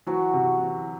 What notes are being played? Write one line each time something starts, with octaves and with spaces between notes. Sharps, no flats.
E3 F#3 F#4
C3
E3